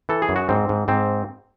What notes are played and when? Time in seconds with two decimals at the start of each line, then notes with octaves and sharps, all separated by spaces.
0.09 E3 A4
0.22 G#4
0.29 F#2
0.36 F#4
0.49 G#2 C4
0.69 G#2
0.88 G#2 C4